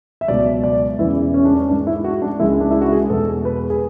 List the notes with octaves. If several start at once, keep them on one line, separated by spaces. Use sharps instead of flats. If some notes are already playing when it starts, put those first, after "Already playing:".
E5
C#2 B2 F#3 D5
D5
E2 C#3 E3 G#3 E4
C#4
D4
C#4
G#2 G#3 D4
E4
F#4
D4
C#2 C#3 G#3 E4
D4
E4
F#4
G#4
E2 B2 G#3 A4
B4
G#4